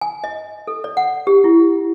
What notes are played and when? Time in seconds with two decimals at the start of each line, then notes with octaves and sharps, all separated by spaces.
0.01 G#5
0.24 D#5
0.67 A4
0.84 D5
0.97 F#5
1.27 G4
1.44 E4